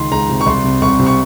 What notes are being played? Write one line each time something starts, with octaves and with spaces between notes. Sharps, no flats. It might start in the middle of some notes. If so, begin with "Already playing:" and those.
Already playing: C#2 D#3 C6
C#2 A#5
C3
C#6
C2 C6
C3
C2 C#6
C3
C#6